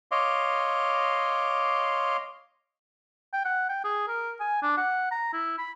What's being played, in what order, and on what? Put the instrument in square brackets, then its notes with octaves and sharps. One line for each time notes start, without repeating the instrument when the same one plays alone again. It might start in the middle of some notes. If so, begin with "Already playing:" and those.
[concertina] C#5 D#5 F5 C6 D6
[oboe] G5
F#5
G5
G#4
A#4
G#5
D4
F#5
A#5
E4
B5